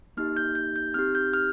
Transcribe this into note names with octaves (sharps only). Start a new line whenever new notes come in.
A#3 D#4 G4 F6
G6
G6
G6
C4 D#4 G4 F6
G6
F6